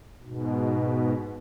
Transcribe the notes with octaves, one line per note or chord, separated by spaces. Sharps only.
G#2 B2